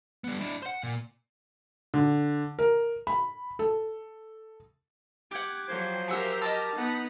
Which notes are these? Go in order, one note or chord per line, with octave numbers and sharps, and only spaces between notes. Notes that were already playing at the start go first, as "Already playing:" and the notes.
G3 B3
D4 E4
C5 F#5
A#2
D3
A#4
B5
A4
G4 F#5 D6 G#6
F3 F#3 C5
G4 A#4 E5 F#5 G#5
D#5 A5 D6 E6
B3 D#4 B4 F#5